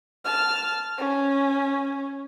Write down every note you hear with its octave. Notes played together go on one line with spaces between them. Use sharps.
A5 F6
C#4